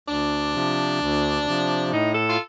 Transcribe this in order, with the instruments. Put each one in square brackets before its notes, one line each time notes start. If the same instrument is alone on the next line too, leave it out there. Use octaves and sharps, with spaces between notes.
[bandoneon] D2 [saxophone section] D4
[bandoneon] C3 F3
D2
C3 F3
[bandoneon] A2 [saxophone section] D#4
[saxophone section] A4
F4